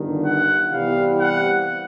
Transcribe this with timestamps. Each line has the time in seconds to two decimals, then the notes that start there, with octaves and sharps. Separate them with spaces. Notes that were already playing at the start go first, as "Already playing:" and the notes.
Already playing: G1 G2 D#3
0.23 F#5
0.71 C2 C3 E3 G3 B3 F5
1.19 F#5